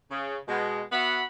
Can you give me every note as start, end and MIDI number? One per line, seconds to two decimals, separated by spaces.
0.11 0.37 49
0.48 0.82 47
0.48 0.82 56
0.92 1.23 59
0.92 1.23 66
0.92 1.23 76
0.92 1.23 78
0.92 1.23 83